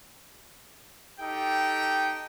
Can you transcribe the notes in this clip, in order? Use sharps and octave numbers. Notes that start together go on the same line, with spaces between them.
D#4 G4 A4 G5